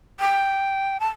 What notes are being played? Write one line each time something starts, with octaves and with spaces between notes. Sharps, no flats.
G5
A5